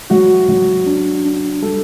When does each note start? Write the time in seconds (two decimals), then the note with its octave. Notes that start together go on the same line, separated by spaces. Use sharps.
0.10 F#3 F#4
0.49 F#3
0.86 D4
1.25 D4
1.62 G3 A4